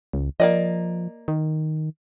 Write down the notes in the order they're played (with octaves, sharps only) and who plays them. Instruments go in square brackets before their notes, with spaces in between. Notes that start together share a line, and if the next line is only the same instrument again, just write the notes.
[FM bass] C#2
[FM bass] F3 [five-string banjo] A#3 D5 D#5
[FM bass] D#3